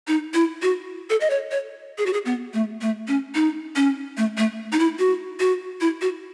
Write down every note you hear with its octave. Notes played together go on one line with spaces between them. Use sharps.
D#4
E4
F#4
A4
D#5
C#5
C#5
G#4
F#4
G#4
B3
A3
A3
C#4
D#4
C#4
A3
A3
D#4
E4
F#4
F#4
E4
F#4